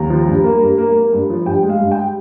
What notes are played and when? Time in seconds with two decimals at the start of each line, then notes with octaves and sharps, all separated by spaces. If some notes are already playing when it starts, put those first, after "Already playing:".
Already playing: D#2 A#5
0.10 F3
0.27 G2
0.44 A#3
0.62 G2
0.78 A#3
0.96 A#3
1.13 G2
1.30 F3
1.46 G2 G5
1.63 G#3
1.69 F5
1.81 G2
1.91 G5